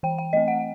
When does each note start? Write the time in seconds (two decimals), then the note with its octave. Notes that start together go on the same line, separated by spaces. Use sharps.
0.03 E3 G5
0.18 G5
0.33 A3 C4 D#5
0.48 F#5